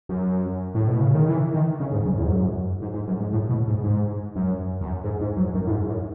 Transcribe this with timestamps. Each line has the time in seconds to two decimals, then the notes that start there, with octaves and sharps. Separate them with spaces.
0.09 F#2
0.75 A2
0.88 B2
1.01 C#3
1.15 D#3
1.29 E3
1.54 D#3
1.80 C#3
1.92 G#2
2.06 F#2
2.18 E2
2.24 G#2
2.30 F#2
2.82 G#2
2.94 G#2
3.08 F#2
3.20 G#2
3.33 A2
3.49 B2
3.68 G#2
3.83 G#2
4.36 F#2
4.81 E2
4.86 F#2
5.04 G#2
5.21 G#2
5.37 F#2
5.54 F#2
5.67 A2
5.71 G#2
5.89 F#2